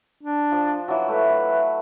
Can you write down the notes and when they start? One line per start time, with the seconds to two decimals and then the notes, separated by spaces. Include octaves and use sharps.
0.23 D4
0.52 F3
0.88 E3 F#3
1.08 A3 B4